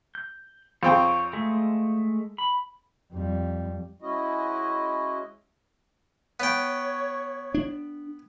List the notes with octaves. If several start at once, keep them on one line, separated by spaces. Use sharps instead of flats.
G6
F2 C4 C#5 G5
G#3 A3
B5
F2 G3
G#3 C#4 E4 F#4 D#5
B3 C#5 G5
D4